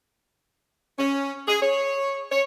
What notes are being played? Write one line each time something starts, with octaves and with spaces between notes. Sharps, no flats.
C#4
G#4
C#5
C#5